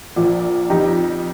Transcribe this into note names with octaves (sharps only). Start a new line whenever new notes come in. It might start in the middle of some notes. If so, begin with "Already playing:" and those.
A#1 A#2 F3
F2 F3 D#4 G4